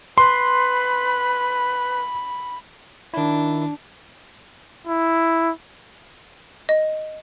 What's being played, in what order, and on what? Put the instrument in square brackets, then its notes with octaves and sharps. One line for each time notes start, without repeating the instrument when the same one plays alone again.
[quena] B4 [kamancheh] B5 [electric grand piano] C6
[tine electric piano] D#3 E4 [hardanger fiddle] D4
[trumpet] E4
[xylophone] D#5